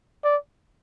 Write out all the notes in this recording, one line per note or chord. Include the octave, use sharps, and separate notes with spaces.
D5